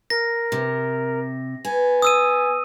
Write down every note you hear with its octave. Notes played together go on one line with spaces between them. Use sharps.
A#4 A#6
C3
B3 G#5
D#6 E6 D#7